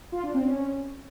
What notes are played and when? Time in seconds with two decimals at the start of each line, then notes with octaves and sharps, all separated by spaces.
0.12 F4
0.23 D4
0.34 C4
0.45 C#4